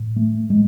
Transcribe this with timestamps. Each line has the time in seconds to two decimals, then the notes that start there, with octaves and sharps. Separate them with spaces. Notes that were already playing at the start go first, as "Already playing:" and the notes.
Already playing: A2
0.16 A3
0.50 A2 G#3